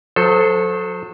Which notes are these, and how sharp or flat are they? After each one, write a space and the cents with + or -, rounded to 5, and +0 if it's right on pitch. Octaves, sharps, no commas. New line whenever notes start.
F#3 -35 A4 +0 C5 -15